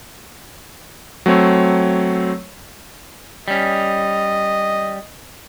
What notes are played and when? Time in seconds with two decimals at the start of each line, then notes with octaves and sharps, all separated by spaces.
1.26 F#3 A3 C4 C#5
3.48 G3 C#4 D#5